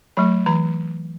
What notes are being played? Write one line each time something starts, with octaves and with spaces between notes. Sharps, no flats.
F#3 A3 B5
E3 A#5